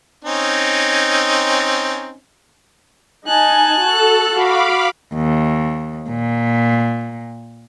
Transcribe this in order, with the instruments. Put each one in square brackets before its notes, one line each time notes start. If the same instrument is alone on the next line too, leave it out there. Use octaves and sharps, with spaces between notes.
[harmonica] C4 C#4 D#4
[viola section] D#4 G#5 [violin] A5 F#6
[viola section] F#4 [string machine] A4
[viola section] F#4 [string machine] F5 B5 D6
[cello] D#2
A#2